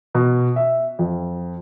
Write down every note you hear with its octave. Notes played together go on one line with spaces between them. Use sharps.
B2
E5
F2